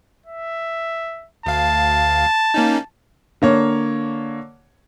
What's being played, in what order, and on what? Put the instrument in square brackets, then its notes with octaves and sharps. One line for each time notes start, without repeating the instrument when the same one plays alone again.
[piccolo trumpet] E5
[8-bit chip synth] D2 F5 [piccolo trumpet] A5
[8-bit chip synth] A#3 C#4 D#4
[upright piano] D3 A#3 C#5